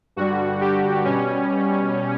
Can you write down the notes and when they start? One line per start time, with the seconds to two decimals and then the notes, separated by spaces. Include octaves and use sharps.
0.16 G2 D3 G3 F#4
0.61 G4
1.05 B2 G3 C#4